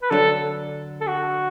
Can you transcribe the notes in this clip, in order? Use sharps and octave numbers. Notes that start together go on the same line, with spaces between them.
B4
D3 F#3 D4 A4
A4
F#4